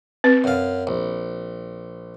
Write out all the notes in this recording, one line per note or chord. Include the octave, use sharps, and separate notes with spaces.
C4 B4
F#2 F5
A#1